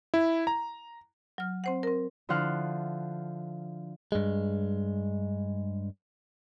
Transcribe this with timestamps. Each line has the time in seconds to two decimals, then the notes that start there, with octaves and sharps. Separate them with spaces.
0.14 E4
0.47 A#5
1.38 F#3 F6
1.64 C4 C5 F#5
1.83 C4 A#4
2.29 D3 F3 E4 C5 F#5 F6
4.12 G2 G#3